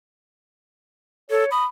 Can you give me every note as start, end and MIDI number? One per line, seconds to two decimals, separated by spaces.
1.31 1.45 69
1.31 1.49 73
1.52 1.67 83
1.52 1.65 87